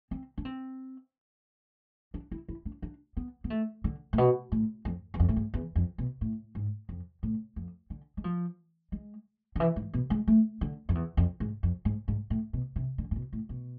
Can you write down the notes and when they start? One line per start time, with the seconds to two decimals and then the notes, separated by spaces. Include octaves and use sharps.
0.11 C4
0.38 D4
0.45 C4
2.14 D4
2.31 E4
2.49 E4
2.65 D4
2.82 D4
3.17 B3
3.44 B3
3.50 A3
3.84 D3
4.13 A2
4.18 B2
4.52 A2
4.85 F2
5.14 E2
5.20 F2
5.29 A2
5.36 G#2
5.54 E2
5.76 F2
5.98 B2
6.21 A2
6.55 G#2
6.89 F2
7.23 A2
7.56 F2
7.90 D3
8.17 G#3
8.24 F3
8.92 G#3
9.56 D3
9.60 E3
9.76 G#2
9.93 B2
10.10 G#3
10.27 A3
10.61 D3
10.89 F2
10.95 E2
11.17 F2
11.40 G#2
11.63 F2
11.85 G#2
12.08 G#2
12.30 A2
12.53 B2
12.76 C3
12.98 D3
13.11 A2
13.16 B2
13.33 A2
13.49 B2